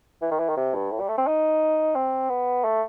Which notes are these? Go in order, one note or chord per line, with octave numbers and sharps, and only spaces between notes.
E3
D#3
E3
D#3
C3
G2
A2
G3
A3
C4
D#4
C4
B3
A3